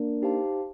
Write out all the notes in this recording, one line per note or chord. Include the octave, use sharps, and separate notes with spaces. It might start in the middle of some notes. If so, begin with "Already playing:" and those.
Already playing: A#3 D4
D#4 G4 C5 F5 A5